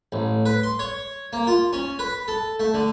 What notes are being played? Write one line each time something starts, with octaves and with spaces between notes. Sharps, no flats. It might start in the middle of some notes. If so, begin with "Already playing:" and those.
A1
B4
C6
C#5
A#3
F4
C#4
B4
A4
A3
D3